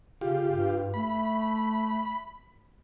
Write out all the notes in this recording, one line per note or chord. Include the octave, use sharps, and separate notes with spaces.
C#3 F4 G4
G2
A3 B5